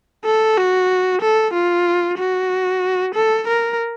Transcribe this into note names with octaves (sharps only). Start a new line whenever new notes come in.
A4
F#4
A4
F4
F#4
A4
A#4